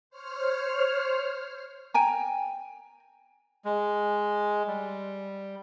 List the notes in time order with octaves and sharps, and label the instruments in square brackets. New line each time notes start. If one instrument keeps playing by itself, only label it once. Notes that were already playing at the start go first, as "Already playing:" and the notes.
[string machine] C5 C#5 F6
[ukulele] G5 G#5 A#5
[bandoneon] G#3
G3